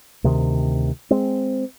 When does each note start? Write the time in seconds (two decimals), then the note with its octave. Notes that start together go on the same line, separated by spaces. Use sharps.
0.24 D2 C3 D#3
1.11 G#3 C4